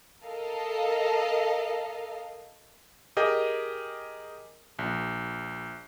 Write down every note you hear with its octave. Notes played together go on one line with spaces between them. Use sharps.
A4 A#4 D#5 F5
G4 G#4 A#4 D#5 G5
A#1